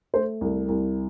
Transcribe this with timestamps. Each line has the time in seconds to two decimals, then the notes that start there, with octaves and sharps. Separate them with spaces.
0.14 A3 C5
0.41 C2
0.69 C2